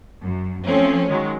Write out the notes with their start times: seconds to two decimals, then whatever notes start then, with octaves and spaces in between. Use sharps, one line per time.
0.24 F#2
0.66 F3 A3 C4 C#4
1.08 D#3 F#3 G#3